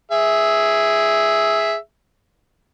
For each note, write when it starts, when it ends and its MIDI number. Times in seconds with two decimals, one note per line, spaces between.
0.11 1.75 68
0.11 1.75 76